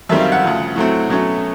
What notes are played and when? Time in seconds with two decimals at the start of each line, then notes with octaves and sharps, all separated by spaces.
0.09 F#2 D#3 G3 C4 E5
0.21 F5
0.32 F#5
0.43 D2 C#3 F3
0.75 A2 F#3 A3 C4
1.09 B2 F#3 A3 C#4